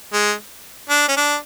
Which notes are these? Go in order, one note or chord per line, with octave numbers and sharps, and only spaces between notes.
G#3
D4
C#4
D4